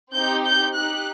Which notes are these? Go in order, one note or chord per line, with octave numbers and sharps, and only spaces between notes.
C4 D#4 G4 G6
G6
D#4 G4 F#6